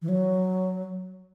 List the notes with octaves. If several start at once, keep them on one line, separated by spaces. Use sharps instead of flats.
E3
F#3